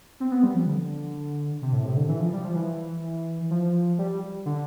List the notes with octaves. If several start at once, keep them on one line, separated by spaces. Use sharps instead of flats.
C4
B3
G3
F3
D3
C3
A2
C3
D3
E3
F3
G3
F3
E3
F3
G3
D3